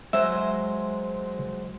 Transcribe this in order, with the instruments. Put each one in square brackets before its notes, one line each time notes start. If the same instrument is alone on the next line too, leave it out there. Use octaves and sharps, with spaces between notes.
[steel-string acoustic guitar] F#3 G#3 C5 [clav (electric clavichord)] E5